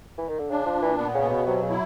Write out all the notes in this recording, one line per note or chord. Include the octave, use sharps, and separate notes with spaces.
E3
D#3
D3
C#3 D4
F3
A#2
E3
B3
C#3
B2
C#3
C3 F#3
C#3
E4